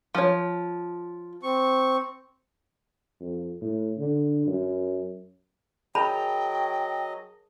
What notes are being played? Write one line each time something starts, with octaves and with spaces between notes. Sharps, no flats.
F3 C#5
C4 C#6
F2
A2
D3
F#2
F#3 G#4 A#4 D#5 G5 A5 B5